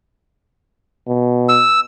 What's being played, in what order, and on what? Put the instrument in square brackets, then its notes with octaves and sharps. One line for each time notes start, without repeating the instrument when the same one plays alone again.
[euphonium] B2
[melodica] E6